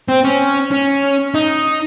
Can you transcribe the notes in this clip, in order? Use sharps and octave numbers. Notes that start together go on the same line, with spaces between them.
C4
C#4
C#4
D#4